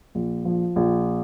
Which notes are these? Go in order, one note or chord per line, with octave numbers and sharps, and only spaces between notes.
A#1
F3
A#1